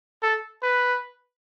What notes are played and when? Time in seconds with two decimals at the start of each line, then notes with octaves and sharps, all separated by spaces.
0.23 A4
0.62 B4